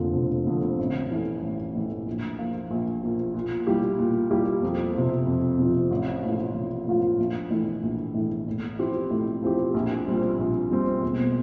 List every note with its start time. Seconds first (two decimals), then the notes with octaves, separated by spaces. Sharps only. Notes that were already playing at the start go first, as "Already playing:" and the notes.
Already playing: F1 F2 D3 F3 A#3
0.15 F1
0.46 F2 D3 F3 A#3
0.78 A1
1.11 A2 E3 A3
1.43 A1
1.75 A2 E3 A3
2.07 A#1
2.39 A#2 F3 A#3
2.71 A#1
3.03 A#2 F3 A#3
3.34 A#2
3.67 G3 A#3 E4 G4
3.99 A#2
4.30 G3 A#3 E4 G4
4.63 F2
4.94 C3 F3
5.27 F2
5.59 C3 F3
5.91 A1
6.23 A2 F3 A#3 F4
6.55 A1
6.87 A2 F3 A#3 F4
7.18 A#1
7.50 A2 E3
7.83 A#1
8.14 A2 E3
8.47 A2
8.79 F3 C4 E4 G4
9.10 A2
9.42 F3 C4 E4 G4
9.74 A#1
10.07 A#2 G3 C4
10.39 A#1
10.70 A#2 G3 C4
11.02 E1